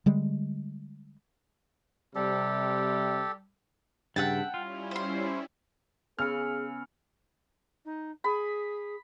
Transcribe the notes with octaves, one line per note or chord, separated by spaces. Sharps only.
D3 G3 G#3
C3 G3 G4 A4
G2 C#3 E5 F#5 G5 A5
G3 C#4 E4 F4
C5 C6
C#3 B3 G#4 G#5 B5 E6 F6 C#7
D#4
G#4 B5